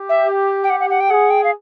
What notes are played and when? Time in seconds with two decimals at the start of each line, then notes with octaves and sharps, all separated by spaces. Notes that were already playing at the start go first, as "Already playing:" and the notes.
Already playing: G4
0.09 E5
0.64 G5
0.70 F#5
0.80 F#5
0.90 F#5
1.00 G5
1.10 G#4 F#5
1.30 G5
1.44 F5